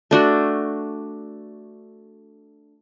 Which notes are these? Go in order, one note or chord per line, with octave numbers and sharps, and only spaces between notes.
A3 D4 F#4